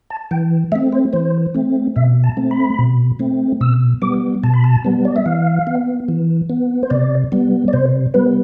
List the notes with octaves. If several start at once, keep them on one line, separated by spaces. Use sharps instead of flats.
A5
E3 G5
A3 C4 E5
C5
E3 C5
A3 C4
B2 E5
A5
A3 C4
B5
B2
A3 C4
B2 E6
G3 B3 D6
B2 A5
B5
A5
G3 B3
D5
E5
E3 F5
B3
E3
B3
C5
C3 D5
G3 B3
D5
C3 C5
G3 B3 B4